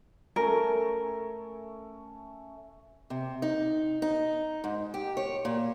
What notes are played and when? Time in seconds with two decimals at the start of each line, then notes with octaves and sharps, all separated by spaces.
0.36 A3 C#4 A#4
3.10 C3
3.42 D#4
4.02 D#4
4.64 G#2
4.94 G4
5.17 C#5
5.45 A#2